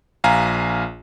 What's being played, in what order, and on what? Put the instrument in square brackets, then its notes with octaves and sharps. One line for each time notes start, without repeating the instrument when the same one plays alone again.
[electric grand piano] A#1 F5 G#5 A#5